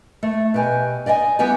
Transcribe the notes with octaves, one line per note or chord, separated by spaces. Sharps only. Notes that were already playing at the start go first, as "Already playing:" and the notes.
A3
B2 G4 G#5
D5 D#5 F5 G#5
E3 G3 B3 G4 D5 G#5